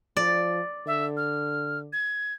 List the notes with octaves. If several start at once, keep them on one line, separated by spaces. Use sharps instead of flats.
F3 D5
D3 E5
F6
G#6